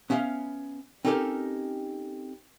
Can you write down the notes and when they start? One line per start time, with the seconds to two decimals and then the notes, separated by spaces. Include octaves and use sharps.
0.10 B3 C#4 E5 F5
1.05 C4 C#4 D#4 G4 A4 A#4